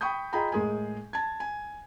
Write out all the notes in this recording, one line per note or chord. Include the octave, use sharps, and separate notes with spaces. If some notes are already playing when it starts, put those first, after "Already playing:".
G5 B5 C#6 D#6 G6
F4 G#4 D#5 G5 A#5 B5
A2 G#3 G#4 A#4 G#5
A5 G#6
G#5